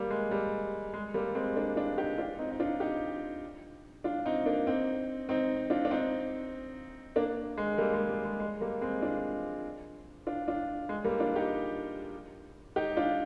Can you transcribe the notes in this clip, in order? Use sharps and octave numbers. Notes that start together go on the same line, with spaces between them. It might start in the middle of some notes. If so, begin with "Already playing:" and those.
Already playing: G3 A#3
G#3
G3
G#3
G3 A#3
G#3 C4
A#3 D4
D4 F4
D#4 G4
D4 F4
C4 D#4
D#4
D4 F4
D#4 G4
D4 F4
C4 D#4
A#3 D4
C4 D#4
C4 D#4
D4 F4
D4
C4 D#4
A#3 D4
G#3
G3 A#3
G#3
G3
G#3
G#3
G3 A#3
G#3 C4
D4 F4
D4 F4
D4 F4
G#3
G3 A#3
D4 F4
D#4 G4
D#4 G4
D4 F4